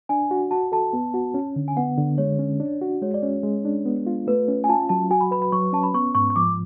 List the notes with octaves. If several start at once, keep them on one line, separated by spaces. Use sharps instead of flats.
D4 G#5
F#4
F#4 A5
A4 A5
B3
F#4
C#4
D3
G#5
B3 F#5
D3
G#3 C#5
C#4
D4
F#4
G#3 C#5
D5
C#4 C#5
G#3
D4
B3
F4
A3 B4
C#4
G#5
F4 A5
F#3 A5
F#4 G#5
B5
B4 B5
B5
F#3 C#6
C#4 A5
B5
B3 C#6
G#2 C#6
C#6
F3 D6